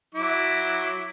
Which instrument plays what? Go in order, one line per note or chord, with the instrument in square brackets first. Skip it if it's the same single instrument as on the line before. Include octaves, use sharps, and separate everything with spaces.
[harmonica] F#3 E4 D6